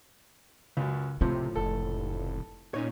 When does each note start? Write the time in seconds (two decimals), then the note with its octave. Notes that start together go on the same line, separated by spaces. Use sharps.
0.77 C#2 F#2 C#3
1.21 C#2 A2 C3 F3 A3 C5
1.56 F1 A4
2.74 A#2 C#4 D#4 C#5